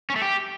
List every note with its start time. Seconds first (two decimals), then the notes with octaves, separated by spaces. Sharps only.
0.10 C#4
0.16 A3
0.22 G4